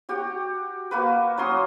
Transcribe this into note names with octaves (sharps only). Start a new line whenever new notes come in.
F#4 G4 F#5
A#3 F#4 B4
F#3 C#4 C6 D#6